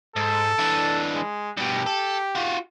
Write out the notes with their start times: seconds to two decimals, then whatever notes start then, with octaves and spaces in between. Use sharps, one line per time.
0.16 G#2 A4
0.59 E3 D4
1.15 G#3
1.57 G2 B2 G4
1.87 A4
2.35 F4 F#4